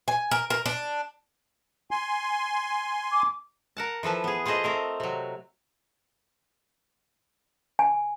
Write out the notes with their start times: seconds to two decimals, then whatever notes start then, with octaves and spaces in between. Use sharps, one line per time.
0.08 G#5
0.31 A#4
0.50 A#4
0.66 D4
1.91 G#5 C6
3.12 D6
3.77 A#4 F#5 A5
4.03 E3 F3 A4 B4
4.24 B3 G#4
4.45 F4 G#4 A4 C5 D#5
4.64 A3 C4 A#4
5.00 C3 F#3
7.79 G#5